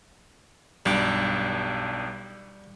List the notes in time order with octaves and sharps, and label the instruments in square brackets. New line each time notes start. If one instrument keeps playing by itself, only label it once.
[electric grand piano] B1 G2 D4 [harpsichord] G3 D6